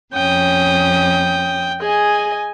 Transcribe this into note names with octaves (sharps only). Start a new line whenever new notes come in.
F2 C#4 G5 D#6
G#4 D#5 G#5